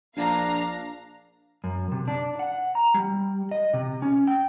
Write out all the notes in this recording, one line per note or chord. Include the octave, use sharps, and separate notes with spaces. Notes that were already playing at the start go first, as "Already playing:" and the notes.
A#1 D4 F5 A#5
F#2
C3
D4
F#5
A#5
G3
D#5
C3
C#4
G5